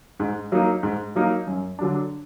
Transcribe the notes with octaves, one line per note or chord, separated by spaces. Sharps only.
G#2
F#3 A#3 D#4 A#4
G#2
F#3 A#3 D#4 A#4
F#2
D3 F#3 D4